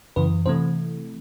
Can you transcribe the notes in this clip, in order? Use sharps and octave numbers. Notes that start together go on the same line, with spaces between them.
F#2 C#3 E3 B4
C3 E3 A3 C5